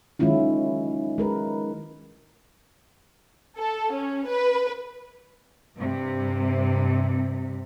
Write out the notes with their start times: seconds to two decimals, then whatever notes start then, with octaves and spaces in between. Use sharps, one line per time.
0.19 D#3 F#3 G#3 C#4 E4 F4
1.18 G#3 A#4 B4
3.59 A4
3.92 C#4
4.27 B4
5.76 G2 C3